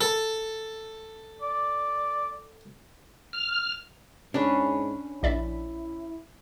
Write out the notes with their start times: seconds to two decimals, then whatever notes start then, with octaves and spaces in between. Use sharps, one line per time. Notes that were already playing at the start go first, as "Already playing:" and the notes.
0.01 A4
1.42 D5
3.33 F6
4.34 G#2 C#4 D4 G#4 B4
5.23 A#1 E4 D5 E5